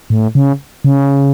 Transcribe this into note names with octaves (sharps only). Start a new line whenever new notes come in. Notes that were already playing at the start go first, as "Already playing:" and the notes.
A2
C#3
C#3